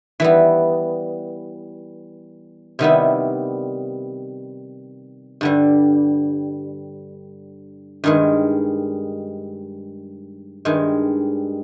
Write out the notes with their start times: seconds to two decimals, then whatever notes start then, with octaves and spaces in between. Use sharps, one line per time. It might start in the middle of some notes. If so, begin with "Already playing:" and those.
0.20 E3 G3 B3
2.79 C3 D#3 G3 B3 E4
5.41 G2 D3 G3
8.04 G2 D#3 G#3
10.65 G2 D#3 G#3